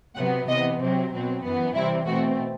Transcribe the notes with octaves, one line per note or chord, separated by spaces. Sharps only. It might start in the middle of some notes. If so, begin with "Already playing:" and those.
C3 F#3 B3 F#5
C3 E3 B3 D#5
C3 F#3 C4
B2 F#3 C4
F#2 E3 B3
C3 E3 G3 C4 E4
B2 A3 C4 F#4